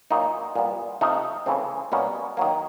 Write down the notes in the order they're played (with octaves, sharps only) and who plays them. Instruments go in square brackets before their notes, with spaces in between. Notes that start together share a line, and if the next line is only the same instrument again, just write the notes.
[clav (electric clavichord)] A#2 F#3 A#3 D#4
A#2 G3 B3
C3 F3 A3 D#4
C#3 E3 A3 C4
B2 G3 A#3 C#4
D#3 F#3 A#3